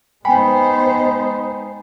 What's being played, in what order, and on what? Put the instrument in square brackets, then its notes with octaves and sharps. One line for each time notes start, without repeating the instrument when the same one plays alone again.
[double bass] G#3 D#4 [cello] B3 C5 [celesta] G5 G#5 [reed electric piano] B5